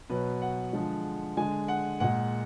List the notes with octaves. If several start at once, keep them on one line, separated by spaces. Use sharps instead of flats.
B2 F#3 B4
F#5
D3 F3 G#3
D3 G#3 G#5
F#5
A#2 G#3 F#5